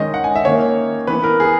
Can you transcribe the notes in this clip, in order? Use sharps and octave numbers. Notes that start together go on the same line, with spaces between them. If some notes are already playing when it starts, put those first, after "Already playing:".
Already playing: D#3 G#3 C#4 D#5
F#5
G#5
E5
D#3 A#3 C#4 C#5
E3 B3 B4
A#4
G#4